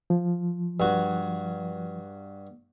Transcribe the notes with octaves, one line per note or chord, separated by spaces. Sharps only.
F3
G2 F#4